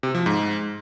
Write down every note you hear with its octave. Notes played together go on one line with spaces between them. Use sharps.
C3
F3
G#2